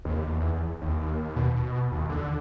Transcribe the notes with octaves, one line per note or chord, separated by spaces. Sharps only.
D#2
E2
D#2
B2
D#2
D3